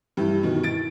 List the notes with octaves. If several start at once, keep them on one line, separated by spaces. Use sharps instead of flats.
G2 E3 E4 G4
B2 D#3 E3
A6 D7